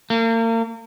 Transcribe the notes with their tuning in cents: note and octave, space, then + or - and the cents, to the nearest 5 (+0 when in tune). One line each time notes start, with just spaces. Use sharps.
A#3 -40